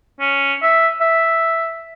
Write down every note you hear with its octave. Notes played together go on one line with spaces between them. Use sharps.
C#4
E5
E5